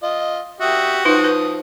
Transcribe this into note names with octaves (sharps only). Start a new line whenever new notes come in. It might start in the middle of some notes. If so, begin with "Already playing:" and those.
F4 D#5
F#4 G4 E5 D#6
F3 D#4 B4 D#6
B4